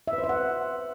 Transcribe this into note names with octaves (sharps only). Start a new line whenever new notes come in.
E5
B4
C5
E5
F#5